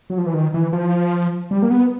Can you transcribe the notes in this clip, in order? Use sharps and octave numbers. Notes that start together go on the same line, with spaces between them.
F#3
F3
E3
D#3
E3
F3
G3
A#3
B3